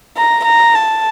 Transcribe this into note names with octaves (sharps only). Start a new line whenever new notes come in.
A#5
A#5
A5